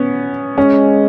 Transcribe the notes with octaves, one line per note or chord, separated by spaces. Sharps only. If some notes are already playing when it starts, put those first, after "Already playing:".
Already playing: B3 C#4
G#3 C#4